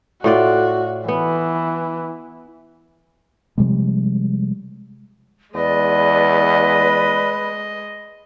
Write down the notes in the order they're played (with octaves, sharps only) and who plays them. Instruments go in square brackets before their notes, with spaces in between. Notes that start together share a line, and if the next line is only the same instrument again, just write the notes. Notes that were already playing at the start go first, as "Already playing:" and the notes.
[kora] A2 F4 D5 [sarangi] F#4
[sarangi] E3 [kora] B3
[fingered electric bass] C3 F3 G3 G#3
[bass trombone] E2 [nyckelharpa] G#3 D#5 [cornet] B4 [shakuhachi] D5